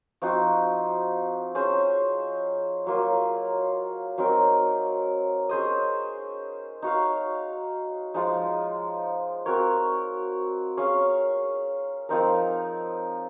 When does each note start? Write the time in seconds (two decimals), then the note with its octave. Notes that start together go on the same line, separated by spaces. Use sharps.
0.22 F3 C4 D#4 F#4
1.55 C#4 G#4 C5
2.86 F#3 A#3 F4
4.18 F#3 C4 D#4 A#4
5.49 C#4 G#4 C5 D#5
6.82 D#4 F#4 C#5 F5
8.14 F3 G#3 D#4
9.46 C4 F#4 A#4 C#5
10.77 C#4 G#4 C#5 F5
12.09 F3 C4 D#4 A#4